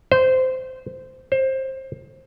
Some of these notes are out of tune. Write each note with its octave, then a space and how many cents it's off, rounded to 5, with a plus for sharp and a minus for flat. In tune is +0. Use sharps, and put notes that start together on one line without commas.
C5 -15
C5 +20